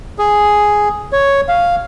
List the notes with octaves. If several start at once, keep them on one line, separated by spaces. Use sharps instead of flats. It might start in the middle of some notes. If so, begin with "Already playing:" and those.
G#4
C#5
F5